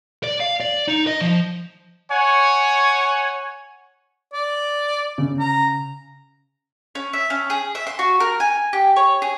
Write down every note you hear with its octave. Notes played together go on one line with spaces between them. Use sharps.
D5
F5
D5
D#4
D#5
F3
C#5 F#5 G#5
D5
C#3
A#5
C#4
E5
C#4
G#4
E5
C6
F#4
A#4
G#5
G4
C#5
G#4